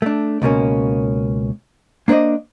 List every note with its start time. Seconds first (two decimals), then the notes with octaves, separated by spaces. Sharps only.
0.02 A3 D4
0.42 C#2 B2 A#3 C#4
2.08 A#3 D4 C5 D5 D#5